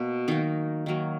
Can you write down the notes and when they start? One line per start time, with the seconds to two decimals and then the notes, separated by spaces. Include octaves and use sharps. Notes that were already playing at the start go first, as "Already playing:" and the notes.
Already playing: B2 A#3
0.28 D#3 F#3 A#3 D#4
0.86 D#3 F#3 A#3